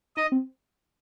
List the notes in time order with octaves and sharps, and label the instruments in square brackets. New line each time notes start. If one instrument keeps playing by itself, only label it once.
[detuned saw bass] D#4 [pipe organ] D#5
[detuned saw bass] C4